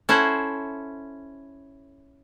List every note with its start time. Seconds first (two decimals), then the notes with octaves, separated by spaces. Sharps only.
0.09 C#4 E4 A4 C5 F#5